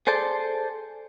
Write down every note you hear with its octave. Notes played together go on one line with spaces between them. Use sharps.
G#4 A4 C5 D5 A5